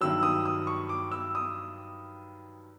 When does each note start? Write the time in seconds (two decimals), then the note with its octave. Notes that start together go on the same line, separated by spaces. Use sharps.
0.01 G2 D#3 F#3 E6
0.23 D#6
0.46 D#6
0.67 C#6
0.89 D6
1.12 E6
1.35 D#6